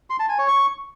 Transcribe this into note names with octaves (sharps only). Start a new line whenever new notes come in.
C6
A5
G#5
C#5
C#6